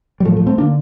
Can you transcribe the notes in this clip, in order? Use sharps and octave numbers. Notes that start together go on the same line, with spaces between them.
G3
A2 F3 A3
F3 A3
A3 C4
D3 A#3 D4